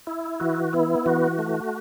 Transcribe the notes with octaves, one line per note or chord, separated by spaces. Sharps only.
E4
E3 F#4
B3 E4
E3 F#4
A3